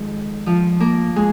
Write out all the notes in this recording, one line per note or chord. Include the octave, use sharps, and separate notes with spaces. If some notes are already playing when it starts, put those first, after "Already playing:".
Already playing: F2 D#3 G#3 G#4
F3 F4
A#3 A#4
G#3 G#4